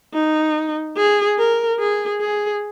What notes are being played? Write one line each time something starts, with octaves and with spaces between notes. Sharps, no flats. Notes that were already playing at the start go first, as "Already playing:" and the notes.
D#4
G#4
A#4
G#4
G#4